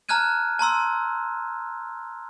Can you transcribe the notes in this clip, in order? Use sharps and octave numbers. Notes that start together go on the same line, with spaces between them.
A5 A#5 F6 F#6 G#6 D#7
A5 A#5 C6 E6